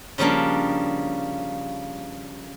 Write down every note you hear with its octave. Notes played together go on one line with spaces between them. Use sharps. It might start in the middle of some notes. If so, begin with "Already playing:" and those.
C#3 F3 G3 A#3 D4